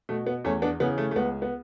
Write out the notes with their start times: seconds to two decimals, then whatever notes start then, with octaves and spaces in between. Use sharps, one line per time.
0.09 B2 A3
0.27 B3
0.45 E2 A3 C#4
0.62 B3 D4
0.80 C#3 E3 B3
0.98 A3
1.11 A3
1.16 C#2 B3
1.42 B3